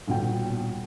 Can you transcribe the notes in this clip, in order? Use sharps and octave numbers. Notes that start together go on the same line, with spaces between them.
D#1 B2 G5